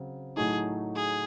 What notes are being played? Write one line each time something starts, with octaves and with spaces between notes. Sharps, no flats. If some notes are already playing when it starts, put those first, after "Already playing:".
Already playing: C#3 F#3 C4
A2 F#3 A3 D#4 G#4
G#4